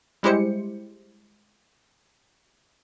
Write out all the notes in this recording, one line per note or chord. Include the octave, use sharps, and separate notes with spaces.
G3 G#3 E4 G4 C5 C#7